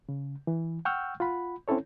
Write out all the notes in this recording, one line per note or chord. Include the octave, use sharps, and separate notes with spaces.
C#3
E3
F#5 G5 C#6 E6 F6 G6
F4 F#5 B5
C4 C#4 E4 A4 C#5